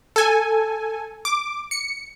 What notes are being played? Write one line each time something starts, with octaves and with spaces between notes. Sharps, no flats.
A4 G#5
D6
C#7